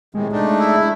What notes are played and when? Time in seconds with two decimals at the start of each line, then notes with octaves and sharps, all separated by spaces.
0.15 A2 C3 D#3 G#3
0.32 A3 D4 D#4
0.59 E4